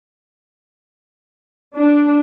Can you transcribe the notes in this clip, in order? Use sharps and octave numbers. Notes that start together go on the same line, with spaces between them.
D4